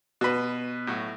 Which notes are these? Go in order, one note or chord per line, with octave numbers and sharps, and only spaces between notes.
B2 B4
A2 F#3 F#4